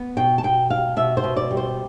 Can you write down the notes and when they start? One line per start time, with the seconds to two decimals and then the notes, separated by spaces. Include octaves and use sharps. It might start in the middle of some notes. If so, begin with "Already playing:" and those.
Already playing: B3
0.17 B2 G5
0.38 A5
0.43 B2 G5
0.70 G3 F5
0.96 B2 E5
1.17 C5
1.24 B2
1.36 D5
1.51 G3
1.57 C5